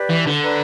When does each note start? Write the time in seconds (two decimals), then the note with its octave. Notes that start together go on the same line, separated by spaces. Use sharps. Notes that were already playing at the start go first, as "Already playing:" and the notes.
Already playing: G4 B4 D5
0.09 E3
0.26 D3
0.43 B4 D5 A#5